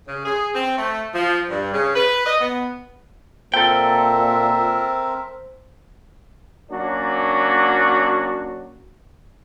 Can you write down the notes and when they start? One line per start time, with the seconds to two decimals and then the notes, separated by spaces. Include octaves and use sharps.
0.07 C#3
0.25 G#4
0.55 C4
0.77 A3
1.15 F3
1.49 G2
1.73 C#3
1.95 B4
2.26 D#5
2.41 B3
3.54 A#2 C4 A4 A#4 C5 E5 G5
6.71 F#3 A#3 C#4 D4 F#4